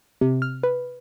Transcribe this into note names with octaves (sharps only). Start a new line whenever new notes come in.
C3
F6
B4